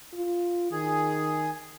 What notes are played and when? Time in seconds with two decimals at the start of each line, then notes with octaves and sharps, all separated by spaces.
0.14 F4
0.72 D#3 G#4